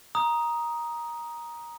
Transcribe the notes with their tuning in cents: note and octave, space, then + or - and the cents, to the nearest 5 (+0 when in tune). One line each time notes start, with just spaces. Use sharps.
A#5 +10 D#6 +0